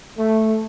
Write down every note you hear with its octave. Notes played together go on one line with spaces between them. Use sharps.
A3